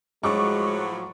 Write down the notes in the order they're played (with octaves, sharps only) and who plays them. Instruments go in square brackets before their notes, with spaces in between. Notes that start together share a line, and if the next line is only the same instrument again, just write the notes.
[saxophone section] A2 F3 F#3 [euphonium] G#3 [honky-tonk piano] C#6 D6